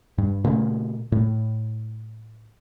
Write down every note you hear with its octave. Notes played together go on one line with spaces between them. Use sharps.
G2
A#2 C#3 A3
A2